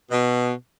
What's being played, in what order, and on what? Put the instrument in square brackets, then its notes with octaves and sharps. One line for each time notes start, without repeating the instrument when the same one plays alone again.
[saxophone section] B2